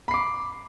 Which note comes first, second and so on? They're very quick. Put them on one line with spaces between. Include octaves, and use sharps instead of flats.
B5 C7 D6